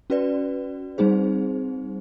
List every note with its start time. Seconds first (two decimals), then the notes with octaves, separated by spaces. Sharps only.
0.10 C#4 F#4 B4 D5
0.98 G3 C4 D#4 G#4 C5